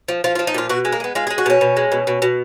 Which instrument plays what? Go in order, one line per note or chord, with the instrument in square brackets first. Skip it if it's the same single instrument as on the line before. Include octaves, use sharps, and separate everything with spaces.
[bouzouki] F3
F3 F4
F4
F3
D#4
A#2 F4
B2 F#4
G#3
A#3
G#3 B3
G#3 F4
G#4
G#3
F#4
B2 C#4
B2
G#3
B2
B2
B2